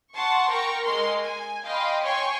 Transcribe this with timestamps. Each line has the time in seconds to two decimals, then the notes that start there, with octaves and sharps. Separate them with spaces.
0.13 F#5 A5 C6 C#6
0.50 A#4 G5 C#6
0.85 G#3 A#4 C6
1.23 G#5
1.65 D#5 F5 G5 B5 C6
2.03 C#5 G5 G#5 C6 C#6